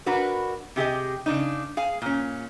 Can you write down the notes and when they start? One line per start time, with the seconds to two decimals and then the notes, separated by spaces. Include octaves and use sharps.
0.06 D4 F#4 A#4 B4
0.76 C3 G4 G#4 D#5
1.26 C#3 D4 D#4
1.77 G#4 F5 G#5
2.02 A#2 C#4